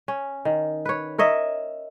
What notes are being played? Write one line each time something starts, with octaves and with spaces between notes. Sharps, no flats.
C#4
D#3
B4 C#5
A#4 C#5 D#5 E5